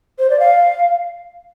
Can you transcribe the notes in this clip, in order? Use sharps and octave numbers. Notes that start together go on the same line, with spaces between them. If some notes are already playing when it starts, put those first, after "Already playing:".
C5
D5
F5